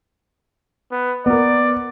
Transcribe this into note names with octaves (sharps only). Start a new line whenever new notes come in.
B3
B3 A#4 D5